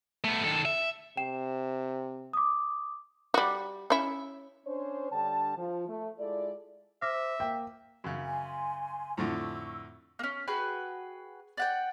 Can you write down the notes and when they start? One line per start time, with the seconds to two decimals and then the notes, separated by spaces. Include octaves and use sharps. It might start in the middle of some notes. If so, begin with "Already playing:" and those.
0.24 A3 B3
0.44 D#3 A4
0.65 E5
1.17 C3 G5 E7
2.33 D6 D#6
3.34 G3 F#4
3.90 C#4 E4
4.67 C#4 D4 C5 C#5
5.12 D3 G3 D4 G5 A5
5.57 F3
5.88 A3
6.19 G#3 E4 F4 A4 D5
7.02 C5 E5 D6 F6 A#6
7.40 A#3 G5
8.04 F#2 C#3
8.25 G#5 C6
9.17 F2 A2 D3 C#6 E6
10.19 A#3 C#4
10.47 F#4 G#4 B4 G5
11.57 D5 F#5 G5